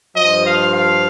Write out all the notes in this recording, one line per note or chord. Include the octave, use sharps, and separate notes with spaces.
G2 F3 D#5
F5
F5